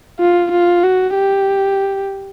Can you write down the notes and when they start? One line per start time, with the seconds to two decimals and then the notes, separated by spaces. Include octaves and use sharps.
0.19 F4
0.51 F4
0.83 F#4
1.15 G4